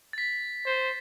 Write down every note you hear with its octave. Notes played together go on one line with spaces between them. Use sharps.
A6 B6
C5